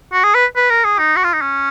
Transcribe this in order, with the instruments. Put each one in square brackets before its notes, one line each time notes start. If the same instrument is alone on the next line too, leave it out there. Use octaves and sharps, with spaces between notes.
[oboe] F#4
G#4
B4
B4
A#4
G#4
D#4
F#4
F4
D#4
C#4